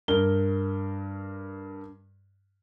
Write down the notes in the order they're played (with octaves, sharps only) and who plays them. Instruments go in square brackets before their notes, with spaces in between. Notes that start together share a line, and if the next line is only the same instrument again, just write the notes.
[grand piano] G2 A#4 G7